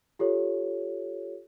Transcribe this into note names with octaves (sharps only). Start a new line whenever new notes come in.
F4 G4 A4 C#5